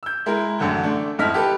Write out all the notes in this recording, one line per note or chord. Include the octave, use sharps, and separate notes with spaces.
E6 G6
G#3 E4 A#4
A1 F#2 D3 G6
A3 D4
F2 G#2 E4 D#5 F6 B6
G4 A4 B4